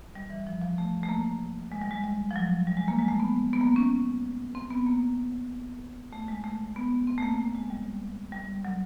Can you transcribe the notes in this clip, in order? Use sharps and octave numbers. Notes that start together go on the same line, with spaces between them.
G3
E3
F3
F3
A3
A3
A#3
G#3
G3
G#3
G3
F3
F#3
G3
G#3
A#3
G#3
A3
B3
B3
A#3
C#4
C4
B3
A#3
A3
G#3
A3
B3
C4
A3
A#3
A3
G#3
G3
G3
F#3